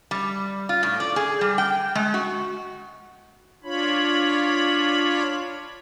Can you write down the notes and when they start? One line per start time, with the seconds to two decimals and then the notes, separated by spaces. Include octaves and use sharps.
0.11 G3
0.69 F4
0.83 A2
1.00 D5
1.16 G#4
1.41 G3
1.58 G5
1.95 G#3
2.14 F#4
3.64 D4 F4 C#5 B5